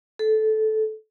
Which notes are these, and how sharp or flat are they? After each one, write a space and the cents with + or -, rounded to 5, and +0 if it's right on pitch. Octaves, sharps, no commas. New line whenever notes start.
A4 -15